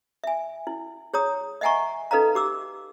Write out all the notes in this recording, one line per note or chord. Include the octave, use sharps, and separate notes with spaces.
E5 G#5
E4
G#4 C#5 A#5 D#6
D#5 E5 F#5 G#5 A#5 C#6
D#4 A4 B4 D#5 F5 A#5
G4 D6 E6